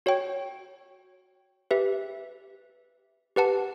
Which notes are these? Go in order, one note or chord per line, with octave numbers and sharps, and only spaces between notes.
F#4 C#5 G5
G4 B4 E5
G4 B4 F#5 A5